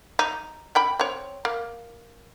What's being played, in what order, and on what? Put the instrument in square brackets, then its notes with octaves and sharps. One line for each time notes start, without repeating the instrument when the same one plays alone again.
[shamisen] D#4
C#4 G5 B5
C4 C#5
A#3